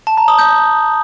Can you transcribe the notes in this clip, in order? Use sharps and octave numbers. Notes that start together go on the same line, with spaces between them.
A5
A#5
D#6
G6